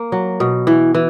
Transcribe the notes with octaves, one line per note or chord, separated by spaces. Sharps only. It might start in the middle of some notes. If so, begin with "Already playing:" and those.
Already playing: A#3
F#3
B2
E3
E3